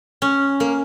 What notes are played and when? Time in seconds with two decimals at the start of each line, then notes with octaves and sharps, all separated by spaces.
0.22 C#4
0.60 A#3